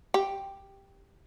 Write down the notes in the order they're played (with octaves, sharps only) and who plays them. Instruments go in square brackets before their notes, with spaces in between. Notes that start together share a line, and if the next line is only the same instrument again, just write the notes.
[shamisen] G4